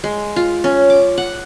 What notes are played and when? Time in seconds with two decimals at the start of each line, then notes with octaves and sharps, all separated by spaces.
0.04 G#3
0.36 F4
0.64 C#4
0.90 D6
1.18 F#5